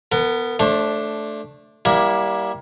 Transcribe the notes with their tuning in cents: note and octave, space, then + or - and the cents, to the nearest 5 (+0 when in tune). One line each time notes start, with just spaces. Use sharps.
B3 +0 A#4 -40
A3 -5 D4 +0 C5 +35
G3 +0 A#3 +25 E4 +0